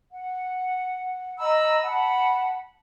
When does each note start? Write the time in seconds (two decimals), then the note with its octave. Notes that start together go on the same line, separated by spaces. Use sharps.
0.12 F#5
1.39 D#5 A#5 B5 E6
1.84 F#5 A5 B5